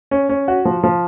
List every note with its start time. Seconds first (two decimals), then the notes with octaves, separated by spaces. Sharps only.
0.11 C#4
0.29 C#4
0.48 F#4
0.65 F3
0.84 F3